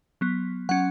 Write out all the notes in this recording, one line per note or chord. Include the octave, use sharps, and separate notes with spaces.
F#3 B3
F#3 C#4 F#5